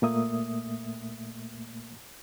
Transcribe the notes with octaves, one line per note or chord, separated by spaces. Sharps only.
A#2 A3 A#3 E5 D#6